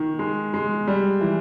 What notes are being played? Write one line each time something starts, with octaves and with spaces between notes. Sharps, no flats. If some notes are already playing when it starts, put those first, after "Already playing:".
Already playing: D#3
G#3
G#3
G3
E3